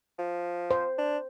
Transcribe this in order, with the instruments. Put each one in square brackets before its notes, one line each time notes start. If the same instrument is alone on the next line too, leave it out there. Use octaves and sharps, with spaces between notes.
[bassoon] F3
[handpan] C5
[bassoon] D4